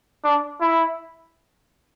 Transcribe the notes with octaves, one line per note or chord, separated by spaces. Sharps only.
D4
E4